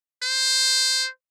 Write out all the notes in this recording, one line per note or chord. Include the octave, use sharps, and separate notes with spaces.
C5